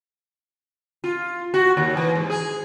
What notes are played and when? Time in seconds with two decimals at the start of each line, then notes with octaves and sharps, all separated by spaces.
1.04 F4
1.54 F#4
1.77 D#2
1.97 E3
2.15 G#2
2.30 G#4